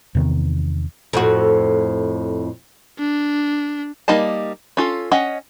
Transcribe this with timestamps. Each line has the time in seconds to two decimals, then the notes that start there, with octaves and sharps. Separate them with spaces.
0.15 E2 C3 D#3 B3
1.13 F2 A2 F#4
2.99 D4
4.08 G3 A#3 D#4 D#5 A5
4.77 C#4 F4 A4
5.12 C#4 D#5 F#5